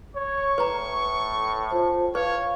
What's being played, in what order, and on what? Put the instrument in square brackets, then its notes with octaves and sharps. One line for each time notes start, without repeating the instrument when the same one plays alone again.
[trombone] C#5 [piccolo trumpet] C#6
[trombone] A2 [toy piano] B4 A#5
[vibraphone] F4 C5 A5
[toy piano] B4 [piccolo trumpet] C#5 [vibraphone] F5